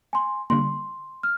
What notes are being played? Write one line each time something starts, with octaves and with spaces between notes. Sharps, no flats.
G#5 C6
D3 G3 A#3 C6
F6